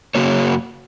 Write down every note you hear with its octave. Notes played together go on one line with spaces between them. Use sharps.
F#2 C#3 A#3 F#4 C#5